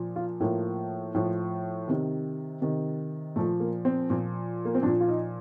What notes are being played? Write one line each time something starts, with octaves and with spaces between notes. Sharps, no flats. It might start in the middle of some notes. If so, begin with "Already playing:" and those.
Already playing: A#2 F3
F4
A2 F3 A#3
A2 F3
C3 D#3
C3 D#3
A#2 F3 A3
A#3
C4
A#2 F3
A#3
C4
A#2 F3 D4
F4
D#4